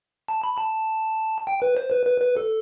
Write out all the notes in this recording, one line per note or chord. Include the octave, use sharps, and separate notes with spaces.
A5
B5
A5
G5
B4
C5
B4
B4
B4
A4